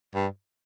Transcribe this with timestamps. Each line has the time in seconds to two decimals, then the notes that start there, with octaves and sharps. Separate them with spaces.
0.15 G2